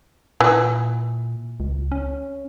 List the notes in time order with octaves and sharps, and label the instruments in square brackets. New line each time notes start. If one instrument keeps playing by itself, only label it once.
[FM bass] A#2 [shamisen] E3
[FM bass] C#2
C#4